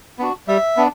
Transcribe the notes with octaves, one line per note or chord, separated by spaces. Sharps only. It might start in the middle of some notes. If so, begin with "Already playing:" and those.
B3 D4 F#4
G3 E5
B3 D4